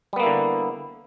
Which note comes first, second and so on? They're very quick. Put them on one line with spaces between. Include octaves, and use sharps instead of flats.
G3 B3 A#3 E4 D3